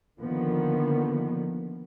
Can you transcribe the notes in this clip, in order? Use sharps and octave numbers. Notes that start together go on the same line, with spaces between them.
D3 D#3 F3 A#3 B3